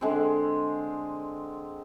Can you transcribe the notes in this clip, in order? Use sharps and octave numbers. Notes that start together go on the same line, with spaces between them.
D3 G#3 C4